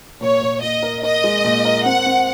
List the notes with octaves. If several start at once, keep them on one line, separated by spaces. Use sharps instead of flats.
A#2 C#5
A#2
A#2 D#5
A#4
A#4 D#5
G#3
A#2
A#4
C4 F#5
C4